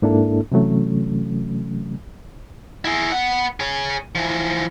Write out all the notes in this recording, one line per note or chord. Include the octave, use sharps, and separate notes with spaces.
G#2 A#3 D4 E4 A4
C3 E3 F#3 A3 C#4
E4 G#4
B3 F#5
G#4 C#5
E3 F3